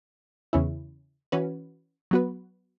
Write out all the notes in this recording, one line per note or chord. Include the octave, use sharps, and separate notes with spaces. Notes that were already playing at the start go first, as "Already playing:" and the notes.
E2 C#3 E3 C#4 E4
E3 C#4 F#4 B4
F#3 B3 F#4 B4